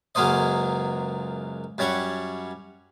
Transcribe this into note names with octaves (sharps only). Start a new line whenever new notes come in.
C#2 F#2 F#3 A#3 C5 D#5
F#2 G3 C#5 F#5